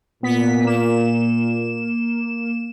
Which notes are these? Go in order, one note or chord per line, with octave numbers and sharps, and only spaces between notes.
A#2 B3 B6
A#3 E7